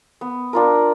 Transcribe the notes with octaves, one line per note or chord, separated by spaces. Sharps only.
B3
D4 F4 A#4